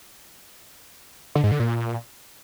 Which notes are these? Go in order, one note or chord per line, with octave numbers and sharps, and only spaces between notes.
D3
G#2
D3
A#2